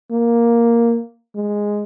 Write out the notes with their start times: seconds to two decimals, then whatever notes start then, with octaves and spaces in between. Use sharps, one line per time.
0.11 A#3
1.36 G#3